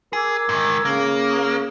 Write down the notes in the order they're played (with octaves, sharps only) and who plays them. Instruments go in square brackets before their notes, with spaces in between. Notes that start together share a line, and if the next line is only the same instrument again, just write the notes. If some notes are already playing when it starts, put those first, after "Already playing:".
[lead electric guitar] G#4 [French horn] A#4 [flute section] D6 E6 G#6
[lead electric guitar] G#2 D#3
[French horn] C#3 [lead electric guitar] A#3
[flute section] A#5 C#6 D#6